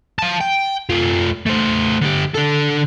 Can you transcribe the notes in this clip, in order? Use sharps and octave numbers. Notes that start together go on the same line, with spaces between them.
F5 A5
G5
A3 F4
A3 C5
D3 G4
D3 A4